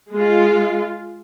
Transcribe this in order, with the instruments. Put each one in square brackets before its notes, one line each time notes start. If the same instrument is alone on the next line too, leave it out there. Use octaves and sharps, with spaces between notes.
[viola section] G#3 F4